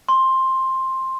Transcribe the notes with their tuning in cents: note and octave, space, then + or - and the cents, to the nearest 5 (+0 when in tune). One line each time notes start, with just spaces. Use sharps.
C6 +10